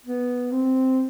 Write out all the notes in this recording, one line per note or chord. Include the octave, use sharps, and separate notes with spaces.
B3
C4